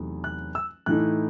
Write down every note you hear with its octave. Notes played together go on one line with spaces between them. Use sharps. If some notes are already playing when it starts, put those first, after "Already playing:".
Already playing: E2 C3 F#3 A3 D#4
F#6
E6
A2 E3 A3 D#4 F#6